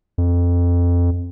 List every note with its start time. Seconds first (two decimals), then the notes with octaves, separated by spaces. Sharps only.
0.18 F2